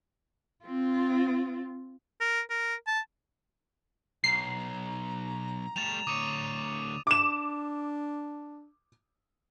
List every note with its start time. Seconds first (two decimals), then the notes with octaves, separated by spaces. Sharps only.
0.65 C4 F4
2.21 A#4
2.50 A#4
2.87 A5
4.24 B1 A#5 C7
5.76 G3 A3 A6 E7 F7
6.07 D2 C#5 D6 D#6 D#7
7.07 D4 D6 E7